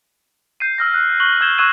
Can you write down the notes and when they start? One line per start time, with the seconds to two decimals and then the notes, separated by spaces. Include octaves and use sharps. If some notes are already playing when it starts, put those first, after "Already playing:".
0.60 G6 C7 D#7
0.78 E6 F6 A#6
0.94 F#6
1.20 C#6 F#6 F#7 G7
1.41 E6 G6 G#6 E7 G7
1.58 C#6 E6 F#6 G#6 D#7 E7